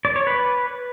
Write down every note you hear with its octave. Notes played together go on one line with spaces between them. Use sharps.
D5
C#5
B4